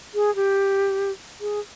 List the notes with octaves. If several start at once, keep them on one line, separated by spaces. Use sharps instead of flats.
G#4
G4
G#4